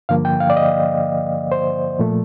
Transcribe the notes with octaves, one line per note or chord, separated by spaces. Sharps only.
G2 D3 F3 A#3 F5
G5
F5
D5
D#5
C5
A#2 F3 A3